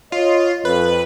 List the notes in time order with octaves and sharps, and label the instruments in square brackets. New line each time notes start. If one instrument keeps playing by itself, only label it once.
[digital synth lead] F4 [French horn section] C#5 D#5
[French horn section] F2 [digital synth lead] B4